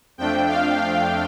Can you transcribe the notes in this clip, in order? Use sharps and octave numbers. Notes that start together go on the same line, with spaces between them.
F2 F3 A3 D4 G5
F5
F5